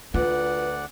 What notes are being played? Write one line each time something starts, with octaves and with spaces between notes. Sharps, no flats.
D2 F4 B4 D5 F#5